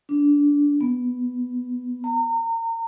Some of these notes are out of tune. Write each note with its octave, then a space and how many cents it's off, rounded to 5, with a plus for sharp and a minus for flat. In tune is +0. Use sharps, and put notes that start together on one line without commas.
D4 -20
B3 +5
A#5 -30